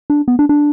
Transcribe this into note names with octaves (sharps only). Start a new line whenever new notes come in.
D4
B3
D4
D4